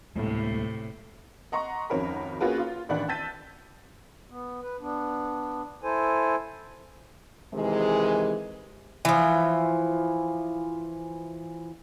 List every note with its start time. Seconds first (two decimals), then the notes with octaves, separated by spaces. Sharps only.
0.16 D2 A2 C3 G#3 A#3
1.52 D#5 F#5 A#5 C6 C#6
1.90 G#1 F2 C#4 F#4 A#4 B5
2.41 A#3 C#4 F4 F#4 G#4 B4
2.58 F4
2.89 A1 D#3 D4 F#5 B5 F#6
3.08 A5 E6 G6 A6 B6 D#7
4.30 B3
4.62 B4
4.81 B3 D4
5.83 E4 A4 C5 G#5
7.53 C3 D#3 E3 G#3
9.05 E3 F3